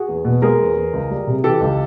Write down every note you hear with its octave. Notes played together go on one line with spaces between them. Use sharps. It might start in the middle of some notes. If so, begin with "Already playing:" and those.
Already playing: F#4 G#4
E2
B2
G#3 G#4 A#4
E2
E2
C#2
G3
C3
E3 G4 A4
C#2